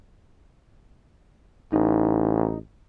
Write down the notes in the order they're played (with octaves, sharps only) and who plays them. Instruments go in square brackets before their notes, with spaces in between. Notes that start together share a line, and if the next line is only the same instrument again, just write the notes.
[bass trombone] A1 [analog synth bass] D#4